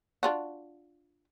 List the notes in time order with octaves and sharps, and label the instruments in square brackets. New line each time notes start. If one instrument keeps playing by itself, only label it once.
[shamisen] D4 F4 F#4